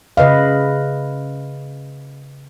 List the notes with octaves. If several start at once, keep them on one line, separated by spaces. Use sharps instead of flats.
C#3 B4 D#5 F5